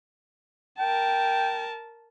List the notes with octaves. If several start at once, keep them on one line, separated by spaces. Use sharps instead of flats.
A#4 G5 A5